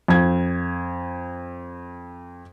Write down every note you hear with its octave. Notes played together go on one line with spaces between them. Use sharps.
F2 G#6